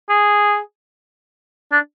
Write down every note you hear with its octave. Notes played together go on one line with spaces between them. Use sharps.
G#4
D4